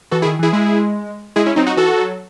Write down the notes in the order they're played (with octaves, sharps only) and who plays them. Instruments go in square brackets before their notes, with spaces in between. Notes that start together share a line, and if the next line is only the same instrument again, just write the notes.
[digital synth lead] E3 [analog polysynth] F#4 A4
[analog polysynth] E4 G#4
[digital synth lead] D#3
[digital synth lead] E3 [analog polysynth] E4 G#4
[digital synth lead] G#3 [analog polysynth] E4 G#4
[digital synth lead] G#3 [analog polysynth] E4 G#4
[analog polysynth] C#4 E4
[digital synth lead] F#3 [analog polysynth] C4 D#4
[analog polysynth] D#4 F#4
[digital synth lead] E3 [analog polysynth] F#4 A4
[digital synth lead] F#3